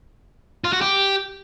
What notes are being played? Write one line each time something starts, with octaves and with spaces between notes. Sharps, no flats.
F4
F#4
G4